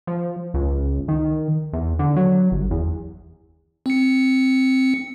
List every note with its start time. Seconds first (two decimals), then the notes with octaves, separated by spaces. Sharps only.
0.07 F3
0.54 C#2
1.08 D#3
1.73 E2
1.99 D3
2.16 F#3
2.52 G1
2.71 E2
3.86 C4 C#7